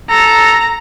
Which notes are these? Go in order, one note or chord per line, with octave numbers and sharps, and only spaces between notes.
A4 A#5